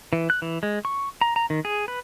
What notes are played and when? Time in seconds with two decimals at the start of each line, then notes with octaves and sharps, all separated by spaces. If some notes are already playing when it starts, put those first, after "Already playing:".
0.13 E3
0.30 F#6
0.42 E3
0.63 G#3
0.85 C#6
1.21 A#5
1.36 A#5
1.50 D#3
1.65 G#4
1.88 B4